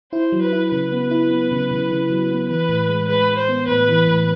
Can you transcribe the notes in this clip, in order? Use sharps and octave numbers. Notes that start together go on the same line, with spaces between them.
E4 C5
F#3
B4
E4
C#3 B4
B3
E4
B3
C#3
C#3
C#3
F#3
B3
E3 B4
A2
G#3
G#3 B4
G#3
C5
B3
A2 B4
E3
A2